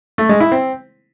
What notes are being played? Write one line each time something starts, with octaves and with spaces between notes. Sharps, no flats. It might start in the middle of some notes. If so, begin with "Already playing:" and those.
A3
G#3
E4
C4